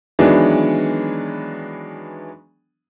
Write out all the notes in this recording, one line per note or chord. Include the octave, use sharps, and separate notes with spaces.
D#3 E3 F#3 G#3 B3 D4